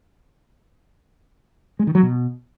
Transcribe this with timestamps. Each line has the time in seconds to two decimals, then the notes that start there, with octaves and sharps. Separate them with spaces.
1.79 G#3
1.87 D#3
1.95 F#3
2.03 B2